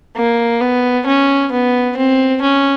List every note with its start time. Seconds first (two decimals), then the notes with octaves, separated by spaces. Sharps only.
0.16 A#3
0.60 B3
1.06 C#4
1.52 B3
1.97 C4
2.42 C#4